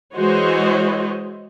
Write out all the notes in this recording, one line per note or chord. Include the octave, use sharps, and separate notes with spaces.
E3 G#3 F#4 C5 C#5 D#5